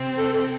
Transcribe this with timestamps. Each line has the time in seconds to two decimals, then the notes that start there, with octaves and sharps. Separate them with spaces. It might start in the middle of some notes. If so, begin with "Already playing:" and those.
Already playing: C3 C4
0.18 A4
0.34 A4